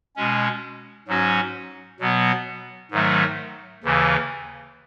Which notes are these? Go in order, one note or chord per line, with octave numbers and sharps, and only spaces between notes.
B2 G#3 C#4
G#2 F#3 C#4 F#4
B2 F#3 B3
G#2 D#3 F#3 A3
D#2 C#3 E3